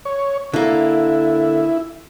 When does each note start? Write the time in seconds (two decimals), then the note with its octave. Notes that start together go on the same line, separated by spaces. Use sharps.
0.05 C#5
0.53 D3 A#3 E4